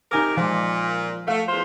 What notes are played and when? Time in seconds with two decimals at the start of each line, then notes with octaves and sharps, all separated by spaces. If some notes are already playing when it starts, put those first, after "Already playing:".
0.11 C3 D#4 A#4 G#5 D6
0.36 A#2 F3 G#3
1.28 A3 F5
1.48 E2 F4 C5